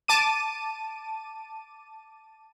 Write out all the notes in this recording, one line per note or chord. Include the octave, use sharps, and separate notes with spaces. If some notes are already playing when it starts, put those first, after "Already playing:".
A5 D6 D#7